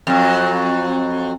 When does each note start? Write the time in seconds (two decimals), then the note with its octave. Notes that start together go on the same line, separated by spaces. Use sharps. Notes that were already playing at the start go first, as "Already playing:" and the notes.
0.07 F2 F#3